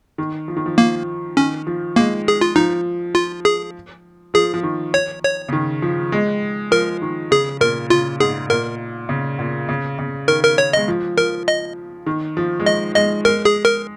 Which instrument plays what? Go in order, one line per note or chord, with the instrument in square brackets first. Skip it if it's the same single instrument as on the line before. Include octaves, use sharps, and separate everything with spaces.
[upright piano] D#3
F3
D#3
F3
[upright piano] F3 [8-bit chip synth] A#3
[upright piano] D#3 [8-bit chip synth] C#4
[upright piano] F3
[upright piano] G#3 [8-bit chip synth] A#3
[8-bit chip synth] G#4
F4
[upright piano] F3 [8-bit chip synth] D#4
[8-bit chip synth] F4
G#4
[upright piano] F3 [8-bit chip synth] G#4
[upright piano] F3
D#3
[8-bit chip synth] C#5
C#5
[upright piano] C#3
D#3
F3
G#3
[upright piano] F3 [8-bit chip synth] A#4
[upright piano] D#3
[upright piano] C#3 [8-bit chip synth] G#4
[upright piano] A#2 [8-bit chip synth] A#4
[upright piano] C#3 [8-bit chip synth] F4
[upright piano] G#2 [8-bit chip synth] G#4
[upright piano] A#2 [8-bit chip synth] A#4
[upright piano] C#3
A#2
C#3
C#3
[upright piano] D#3 [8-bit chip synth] A#4
[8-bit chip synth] A#4
C#5
[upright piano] G#3 [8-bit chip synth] D#5
[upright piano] F3
[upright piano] F3 [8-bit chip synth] A#4
[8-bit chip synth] D#5
[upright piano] D#3
F3
G#3
[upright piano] F3 [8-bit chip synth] D#5
[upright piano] G#3 [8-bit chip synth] D#5
[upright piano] G#3 [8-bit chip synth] A#4
[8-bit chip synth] G#4
A#4